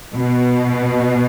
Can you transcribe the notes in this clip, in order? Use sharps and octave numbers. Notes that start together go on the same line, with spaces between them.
B2